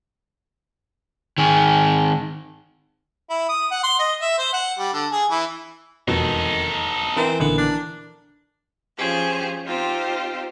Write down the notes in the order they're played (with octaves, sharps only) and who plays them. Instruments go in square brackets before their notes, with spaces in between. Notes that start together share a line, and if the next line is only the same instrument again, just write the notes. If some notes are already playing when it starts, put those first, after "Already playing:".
[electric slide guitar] D#3 G#4
[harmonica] E4
D#6
F#5
C6
D#5
E5
C5
F#5
G3
D3
G#4
E3
[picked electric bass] E1 F2 B2 [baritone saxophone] D#3 [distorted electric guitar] D#4 A4
[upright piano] E3 A#4 [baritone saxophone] C4
[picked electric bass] A#1 D3 D#3 [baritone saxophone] B3
[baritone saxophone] D4
[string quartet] F3 C#4 F4 G4 G#4 C5
C4 D#4 F4 G4 C5